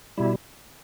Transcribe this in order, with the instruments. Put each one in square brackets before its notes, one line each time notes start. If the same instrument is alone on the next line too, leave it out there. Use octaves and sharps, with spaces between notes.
[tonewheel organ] B2 G3 E4